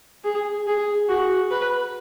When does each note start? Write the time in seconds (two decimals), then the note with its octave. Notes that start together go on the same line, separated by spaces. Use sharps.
0.24 G#4
0.67 G#4
1.09 F#4
1.51 B4